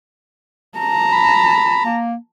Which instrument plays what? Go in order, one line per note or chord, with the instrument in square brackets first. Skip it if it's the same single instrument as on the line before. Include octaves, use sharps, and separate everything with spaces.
[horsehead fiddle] A5 A#5
[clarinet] B5
A#3